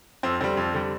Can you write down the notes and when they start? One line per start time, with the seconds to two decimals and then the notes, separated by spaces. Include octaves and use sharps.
0.23 F2 C4
0.41 D3 G3 C4
0.57 F2
0.74 D3 G3